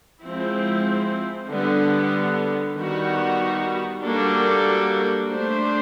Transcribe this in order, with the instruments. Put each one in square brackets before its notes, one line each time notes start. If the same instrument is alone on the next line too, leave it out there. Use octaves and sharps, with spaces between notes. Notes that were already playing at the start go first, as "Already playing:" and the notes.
[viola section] F3 G#3 C4 E4
D3 G3 B3
D#3 G3 B3 D#4 F#4
G3 A#3 D4 F#4 A4
A3 D4 G4 C5